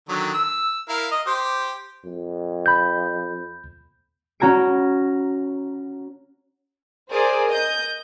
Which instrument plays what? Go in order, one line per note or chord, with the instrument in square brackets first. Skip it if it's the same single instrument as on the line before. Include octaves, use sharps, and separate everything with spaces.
[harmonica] D3 D#3 F#3
E6
E4 A#4 F5
D#5
G4 C5
[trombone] F2
[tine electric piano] B5 G6
[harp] C#4 F#4 A#5 G#6 D7
[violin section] G#4 A#4 C5 D5
D#5 G6